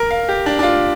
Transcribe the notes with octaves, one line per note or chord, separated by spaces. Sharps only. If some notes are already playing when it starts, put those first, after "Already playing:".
Already playing: A#4
F5
G4
D4
D4
F4